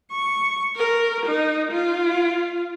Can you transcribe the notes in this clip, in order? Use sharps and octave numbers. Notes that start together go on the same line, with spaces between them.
C#6
A#4
D#4
F4